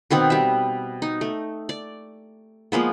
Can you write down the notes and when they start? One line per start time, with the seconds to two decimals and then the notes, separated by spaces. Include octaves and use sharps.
0.10 B2 D#3 B3 C4
0.30 G3 E5
1.02 D#4
1.21 A3
1.69 D5
2.72 F3 G#3 A#3 B3